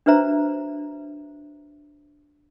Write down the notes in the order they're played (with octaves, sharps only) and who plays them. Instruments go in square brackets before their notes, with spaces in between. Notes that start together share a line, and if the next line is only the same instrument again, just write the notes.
[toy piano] D4 F#4 B4 C5 E5 A#5